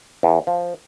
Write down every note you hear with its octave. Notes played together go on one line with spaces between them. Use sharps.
E2
F3